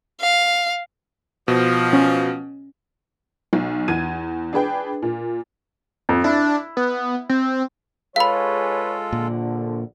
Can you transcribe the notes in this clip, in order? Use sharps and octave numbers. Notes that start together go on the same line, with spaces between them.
F5
B2 F3
C#4
B1
E2 G#6 D#7
D4 G#4 B4 G5
A#2
F2
D4 E4
B3
C4
G#3 F4 G#4 A4 B4 C#5 F5 B5
A#1 A#2 D3